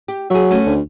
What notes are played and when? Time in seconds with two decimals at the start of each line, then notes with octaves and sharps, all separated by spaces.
0.08 G4
0.30 F#3 G#4 E5
0.50 A3 C#4 F#4
0.66 D2